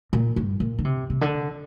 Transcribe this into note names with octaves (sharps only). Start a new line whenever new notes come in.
A#2
G2
A#2
D3
C3
C3
D3